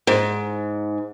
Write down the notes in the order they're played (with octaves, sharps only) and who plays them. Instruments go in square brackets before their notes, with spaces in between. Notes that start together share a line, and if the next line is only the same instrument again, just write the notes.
[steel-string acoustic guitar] G#2